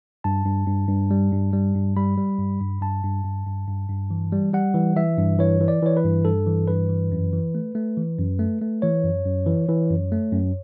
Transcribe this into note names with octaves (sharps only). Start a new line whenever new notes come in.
G2 A5
G2
G2
G2
G3
G2
G3
G2
G3 B5
G3
G2
G2
G2 A5
G2
G2
G2
G2
G2
E3
G3
G3 F#5
E3
E3 E5
G2
E3 C#5
E3
D5
E3 C#5
B4
G2
G2 A4
E3
G2 B4
E3
F#2
E3
A3
A3
E3
F#2
A3
A3
E3 C#5
F#2
F#2
E3
E3
F#2
A3
F#2